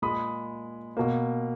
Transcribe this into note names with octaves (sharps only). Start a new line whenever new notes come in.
A#2 G#3 B5 D#6
B2 A#3